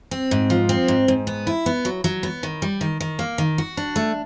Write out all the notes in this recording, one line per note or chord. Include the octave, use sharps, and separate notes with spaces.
C4
G#2
F3
C4
G#2
G#2
B3
E4
B3
F#3
F#3
B3
D#3
G3
D#3
D#3
A#3
D#3
F#4
D4
A3